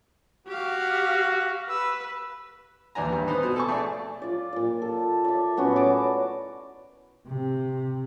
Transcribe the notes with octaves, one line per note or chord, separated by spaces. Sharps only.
F#4 G4 F5
B4 E6
D#2 E3 D4 G#5 A#5
G2 E3
B3 D#4 B4 C5
B2
A4 G#5 C#6
A3 G#4 D5
F4 D5
A#2 D5
A4
D5 E5
A2 B3 C#4 F#4
A5 A#5 D6
C3